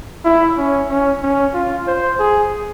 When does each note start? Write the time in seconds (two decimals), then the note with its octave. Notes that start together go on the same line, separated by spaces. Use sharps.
0.25 E4
0.57 C#4
0.90 C#4
1.22 C#4
1.54 F4
1.87 C5
2.19 G#4